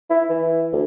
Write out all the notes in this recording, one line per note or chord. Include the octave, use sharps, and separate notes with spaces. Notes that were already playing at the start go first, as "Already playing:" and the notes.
E4
E3
D2